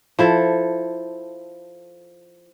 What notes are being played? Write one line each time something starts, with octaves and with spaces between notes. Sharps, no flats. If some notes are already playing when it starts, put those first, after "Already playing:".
F3 E4 A4